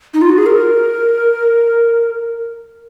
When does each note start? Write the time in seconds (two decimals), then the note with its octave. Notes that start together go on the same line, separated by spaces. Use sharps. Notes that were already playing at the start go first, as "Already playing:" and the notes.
0.14 D#4
0.21 F4
0.29 F#4
0.38 G#4
0.46 A#4